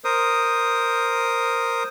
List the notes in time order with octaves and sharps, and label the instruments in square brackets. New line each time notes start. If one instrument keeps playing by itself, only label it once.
[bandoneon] A#4 C5 D#6